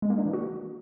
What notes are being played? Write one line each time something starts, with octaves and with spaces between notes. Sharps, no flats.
G#3
A#3
D4
E3
F#4